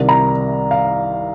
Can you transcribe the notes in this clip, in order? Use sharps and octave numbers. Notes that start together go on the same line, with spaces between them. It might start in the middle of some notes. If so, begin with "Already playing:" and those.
Already playing: C2 C3 D#3
A#5
F5